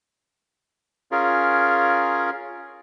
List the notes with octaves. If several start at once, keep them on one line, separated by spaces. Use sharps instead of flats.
C#4 F4 G#4 A#4